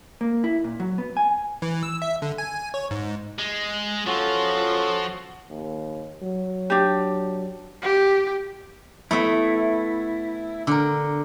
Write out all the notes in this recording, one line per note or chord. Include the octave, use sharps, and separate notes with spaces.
A#3
E4
A#2
F#3
B3
G#5
E3
E6
E5
D3
G#5
C#5
G#2
G#3
F3 C#4 F4 F#4 A4
D#2
F#3
D4 G4
G4
A3 B3 E4 E5
D3 A#4